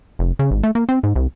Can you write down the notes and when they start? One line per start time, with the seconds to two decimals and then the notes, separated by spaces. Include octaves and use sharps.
0.19 F1
0.39 C#3
0.51 G#1
0.63 A3
0.75 A#3
0.89 C4
1.03 G#2
1.16 C2